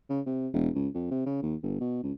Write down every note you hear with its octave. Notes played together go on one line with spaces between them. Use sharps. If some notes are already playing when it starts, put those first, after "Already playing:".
C#3
C3
E1
C#2
F2
C3
C#3
D#2
G1
B2
C#2